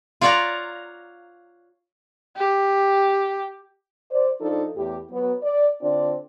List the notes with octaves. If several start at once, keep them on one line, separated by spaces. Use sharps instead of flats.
F4 C#5 D5 F5 F#5 A#5
G4
C5 D5
F3 D4 D#4 F4 A4
E2 A2 G4
F#3 B3
D5
D3 C4 D4 F4 D5